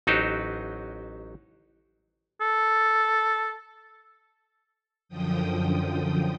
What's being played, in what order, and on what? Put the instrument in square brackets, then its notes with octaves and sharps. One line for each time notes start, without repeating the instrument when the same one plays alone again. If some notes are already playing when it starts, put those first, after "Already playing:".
[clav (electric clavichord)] A1 F#3 D#4 F#4 G4 C5
[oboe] A4
[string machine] F#2 D3 F3 G5 D#6